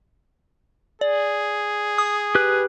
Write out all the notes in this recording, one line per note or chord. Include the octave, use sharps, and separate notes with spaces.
G#4 D5
D#6
G4 B4 F#6